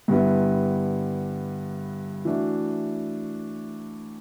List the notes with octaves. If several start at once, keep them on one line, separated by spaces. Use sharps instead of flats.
G2 D3 G3 B3 E4
E3 A3 D4 F#4